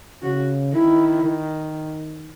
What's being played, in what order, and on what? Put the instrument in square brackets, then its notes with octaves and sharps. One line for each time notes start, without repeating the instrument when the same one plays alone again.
[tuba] C#3 [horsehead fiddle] F#4
[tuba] D#3 [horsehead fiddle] E4
[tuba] D#3